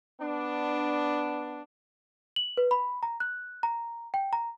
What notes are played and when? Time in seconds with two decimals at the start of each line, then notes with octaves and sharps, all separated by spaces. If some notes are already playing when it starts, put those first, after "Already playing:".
0.21 B3 D4
2.36 F#7
2.57 B4
2.71 B5
3.03 A#5
3.20 F#6
3.63 A#5
4.14 G5
4.33 A#5